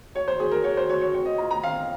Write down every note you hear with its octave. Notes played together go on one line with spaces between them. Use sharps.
F#3 C#5
C5
F#3 G#4
A#4
F#4 C#5
C5
F#3 C#5
C#5
C4 C#5
D#5
F4 A#5
A#5
C4 F5